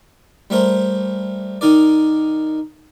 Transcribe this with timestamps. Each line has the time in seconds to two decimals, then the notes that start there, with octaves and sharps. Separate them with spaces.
0.50 G3 A3 A#4 C5
1.61 D#3 D#4 A#4 D5